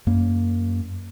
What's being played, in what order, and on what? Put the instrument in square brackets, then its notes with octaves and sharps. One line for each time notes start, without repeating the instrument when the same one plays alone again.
[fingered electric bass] F#2 A#3